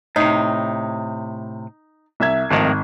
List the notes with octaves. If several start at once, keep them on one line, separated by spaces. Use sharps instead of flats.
A2 C3 D#4
C2 E5 G#6
G#1 F2 A2 D#3